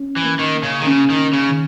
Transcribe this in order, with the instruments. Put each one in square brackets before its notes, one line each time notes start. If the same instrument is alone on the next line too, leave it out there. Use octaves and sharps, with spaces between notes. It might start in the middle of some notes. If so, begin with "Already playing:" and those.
Already playing: [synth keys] C#4
[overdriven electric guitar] E3
[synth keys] A#3
[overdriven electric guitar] D#3
[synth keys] A#3
[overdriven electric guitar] C#3
D#3
[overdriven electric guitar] C#3 [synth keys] C#4
[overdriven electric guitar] D#3
[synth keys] C#4
[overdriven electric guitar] C#3
[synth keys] D#3